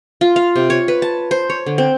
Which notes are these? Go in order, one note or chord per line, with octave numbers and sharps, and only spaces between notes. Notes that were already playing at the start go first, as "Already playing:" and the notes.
F4
F5
C3
C#5
B4
A5
C5
C#5
D3
C4